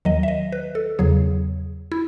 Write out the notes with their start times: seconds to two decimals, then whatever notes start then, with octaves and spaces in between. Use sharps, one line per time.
0.05 D#2 D#3 F#3 D#5
0.23 E5
0.28 D#5
0.52 B4
0.75 A4
0.99 E2 C#3 F#3 G#4
1.92 E4